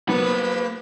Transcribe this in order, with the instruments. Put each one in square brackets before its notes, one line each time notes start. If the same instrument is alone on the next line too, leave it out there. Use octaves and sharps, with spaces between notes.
[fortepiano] F#3 B3 [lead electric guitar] A#3 B5 [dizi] B4